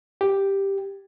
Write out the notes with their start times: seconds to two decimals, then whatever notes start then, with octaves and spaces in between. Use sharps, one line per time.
0.21 G4